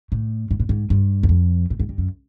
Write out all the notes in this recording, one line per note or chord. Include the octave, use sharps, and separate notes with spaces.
A2
G#2
A2
G#2
G2
F#2
F2
A2
G#2
G2
F#2